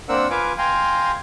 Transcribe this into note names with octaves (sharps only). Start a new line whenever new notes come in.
A#3 C4 D4 A#4 F#5 E6
F4 B4 F5 G#5 D6
F5 G5 G#5 A#5 C6